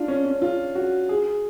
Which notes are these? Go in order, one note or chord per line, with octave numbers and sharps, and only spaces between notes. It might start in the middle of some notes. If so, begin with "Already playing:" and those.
Already playing: D4 F4
C#4
C#4
F4
F#4
G#4